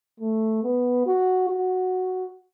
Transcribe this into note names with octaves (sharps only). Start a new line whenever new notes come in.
A3
B3
F#4
F#4